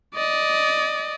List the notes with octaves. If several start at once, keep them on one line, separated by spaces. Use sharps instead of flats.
D5 D#5